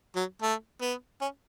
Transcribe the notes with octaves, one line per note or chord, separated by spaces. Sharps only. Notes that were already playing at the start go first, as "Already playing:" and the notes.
F#3
A3
B3
C#4